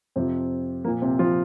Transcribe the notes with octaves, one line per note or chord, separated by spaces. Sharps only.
F2 C3 F3 C4
A#2 F3 A#3
C3 C4
F3 F4